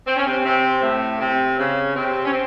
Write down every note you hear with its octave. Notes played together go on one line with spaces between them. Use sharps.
C4
C#4
C3 C4
C3 C4
A2 A3
C3 C4
C#3 C#4
C3 C4
C#4
C4